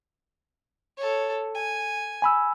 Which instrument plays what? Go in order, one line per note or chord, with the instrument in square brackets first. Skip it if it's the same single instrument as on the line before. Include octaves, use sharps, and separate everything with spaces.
[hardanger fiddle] A4 C#5
G#5
[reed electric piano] G#5 B5 E6